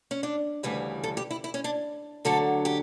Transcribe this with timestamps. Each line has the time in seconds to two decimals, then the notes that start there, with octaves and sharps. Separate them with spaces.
0.11 C#4
0.23 D4
0.63 D2 C#3 E3 G3 B4
1.04 A4
1.17 G4
1.31 E4
1.44 E4
1.54 C#4
1.64 D4
2.25 D2 D3 F#3 A4
2.65 G4